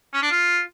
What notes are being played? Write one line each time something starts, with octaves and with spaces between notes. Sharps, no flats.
C#4
D4
F4